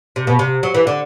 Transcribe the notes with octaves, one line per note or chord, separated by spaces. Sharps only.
C3
B2
C3
F#3
E3
D3